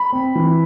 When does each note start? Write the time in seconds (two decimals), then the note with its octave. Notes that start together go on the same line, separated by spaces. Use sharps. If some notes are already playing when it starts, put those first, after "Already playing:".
Already playing: B5
0.13 C4
0.35 E3